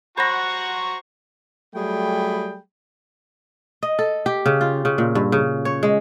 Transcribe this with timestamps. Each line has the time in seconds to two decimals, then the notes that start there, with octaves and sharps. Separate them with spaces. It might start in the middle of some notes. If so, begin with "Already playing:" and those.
0.18 F#4 C5 F#5 A#5 B5 C#6 A#6
1.74 F#3 G3 A3 G#4 G5 B5
3.83 D#5
3.99 A4
4.26 G4
4.46 C#3
4.61 F4
4.85 C#3
4.98 A#2
5.15 G2
5.32 C#3
5.65 C#5
5.83 G#3